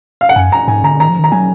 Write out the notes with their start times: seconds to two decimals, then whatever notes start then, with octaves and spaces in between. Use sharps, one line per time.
0.21 F5
0.29 F#5
0.36 F#2 G#5
0.52 A#5
0.68 G#2 G#5
0.84 D3 A#5
1.00 D#3 A#5
1.09 F3
1.19 D#3 A#5
1.32 F#3 G#5